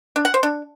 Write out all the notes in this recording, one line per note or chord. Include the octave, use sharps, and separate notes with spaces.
D4
F#5
C5
D4